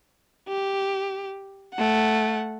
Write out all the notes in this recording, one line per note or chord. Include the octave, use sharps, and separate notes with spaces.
G4
A3 F#5